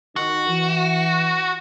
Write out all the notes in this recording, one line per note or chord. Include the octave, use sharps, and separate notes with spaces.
D#3 F#4
E3